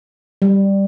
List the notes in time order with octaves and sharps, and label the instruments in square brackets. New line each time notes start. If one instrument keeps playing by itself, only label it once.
[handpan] G3